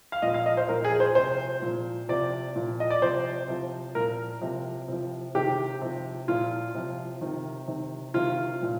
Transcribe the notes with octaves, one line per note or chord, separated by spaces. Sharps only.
F5
A#2 F3 D#5
F5
D#5
C5
A#2 F3 A#4
G#4
C5
C3 F3 C5
A#2 F3
C3 F3 D5
A#2 F3
D#5
D5
C3 F3 C5
C3 F3
A#2 F3 A#4
C3 F3
C3 F3
C3 D#3 G4
C3 F3
A#2 F3 F4
C3 F3
C3 D#3
C3 D#3
C3 D#3 F4
A#2 F3